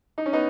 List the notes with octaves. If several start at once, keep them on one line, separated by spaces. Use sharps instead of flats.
D#4
C#4
B3 D#4